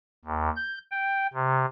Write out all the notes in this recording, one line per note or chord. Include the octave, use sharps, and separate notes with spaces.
D#2
G6
G5
C3